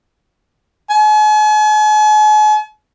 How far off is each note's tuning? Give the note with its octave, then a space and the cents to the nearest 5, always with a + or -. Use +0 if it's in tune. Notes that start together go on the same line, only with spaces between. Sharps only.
G#5 +45